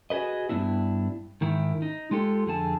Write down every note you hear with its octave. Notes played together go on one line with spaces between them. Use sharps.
F#4 G#4 A#4 B4 D#5
G2 D#3 B3 D4 E4
G#2 D#3 E4
D#4
G#3 F4 G4 A4
F2 D3 G#4 A5